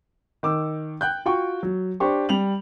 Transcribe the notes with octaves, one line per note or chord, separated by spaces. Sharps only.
D#3 D6 E6
G5 F#6 G6
F4 F#4 G5 C#6
F#3
D4 G4 C5 C#6
G3 F7 F#7